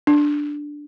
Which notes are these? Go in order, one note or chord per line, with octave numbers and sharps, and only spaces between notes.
D4